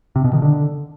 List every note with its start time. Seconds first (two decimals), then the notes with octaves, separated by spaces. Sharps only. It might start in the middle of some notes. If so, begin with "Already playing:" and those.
0.16 C3
0.24 B2
0.33 D#3
0.42 D3